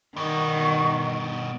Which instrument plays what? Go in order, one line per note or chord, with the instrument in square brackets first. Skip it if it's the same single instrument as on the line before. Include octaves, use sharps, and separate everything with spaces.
[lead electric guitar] G2 B2 [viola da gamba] D#3 [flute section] D#5 C#6